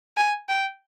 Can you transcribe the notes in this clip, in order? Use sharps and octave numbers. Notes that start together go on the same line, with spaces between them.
G#5
G5